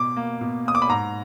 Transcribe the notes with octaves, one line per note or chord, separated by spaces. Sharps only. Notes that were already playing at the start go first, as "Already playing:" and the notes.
Already playing: B2 D6
A#3
B2
A#3 D#6
D6
B5
G#2 A#5